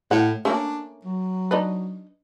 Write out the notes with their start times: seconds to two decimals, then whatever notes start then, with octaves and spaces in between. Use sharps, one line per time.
0.11 A2 F#5
0.45 A3 A#3 C#4 D4
1.05 F#3
1.51 D4 D#4 B4